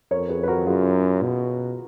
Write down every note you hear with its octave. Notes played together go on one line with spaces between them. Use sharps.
F2 A#4 C#5
G#4 B4
B4
F#4 A#4
F#2 F4 G#4
B2